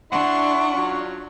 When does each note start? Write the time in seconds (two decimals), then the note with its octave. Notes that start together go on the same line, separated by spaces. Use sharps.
0.12 D4 E4 F#5 C6 C#6
0.73 F#3 F4